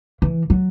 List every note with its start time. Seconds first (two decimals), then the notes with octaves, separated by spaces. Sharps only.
0.22 E3
0.50 F#3